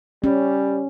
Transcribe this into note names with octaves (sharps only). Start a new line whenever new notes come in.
G3 C#4